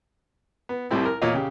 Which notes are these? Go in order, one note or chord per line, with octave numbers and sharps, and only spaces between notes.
B3
C2 A2 G3 C4 E4
A#4
E2 A#2 C#5 D#5 F5
C#3 G4